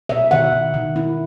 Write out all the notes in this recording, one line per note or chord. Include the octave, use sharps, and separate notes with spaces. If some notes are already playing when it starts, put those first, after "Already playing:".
B2 E5
D#3 F#5
D#3
D#3
E4